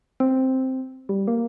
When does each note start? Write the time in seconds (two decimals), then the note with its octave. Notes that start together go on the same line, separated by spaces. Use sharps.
0.20 C4
1.09 G3
1.28 A#3